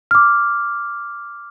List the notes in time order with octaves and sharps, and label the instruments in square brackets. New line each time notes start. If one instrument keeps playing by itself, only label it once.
[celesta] D6 F6